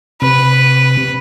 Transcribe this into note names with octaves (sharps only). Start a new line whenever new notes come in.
C3 B4